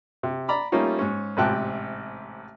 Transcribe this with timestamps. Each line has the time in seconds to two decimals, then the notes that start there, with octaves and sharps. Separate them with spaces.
0.23 C3
0.48 D5 A#5 B5 D6
0.72 G3 A3 A#3 C#4 D#4 F4
0.99 G#2 C#4
1.37 A1 G#2 C3 G5 A5 F#6